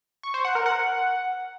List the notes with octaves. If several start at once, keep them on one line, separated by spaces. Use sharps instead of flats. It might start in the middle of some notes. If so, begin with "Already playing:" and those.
C#6
C5
F#5
A#4
F#5